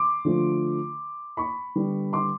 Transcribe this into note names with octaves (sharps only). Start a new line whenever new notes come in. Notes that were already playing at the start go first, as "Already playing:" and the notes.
Already playing: C6 D6
D3 F3 A3
B5 C#6
D3 G3 B3
C6 D6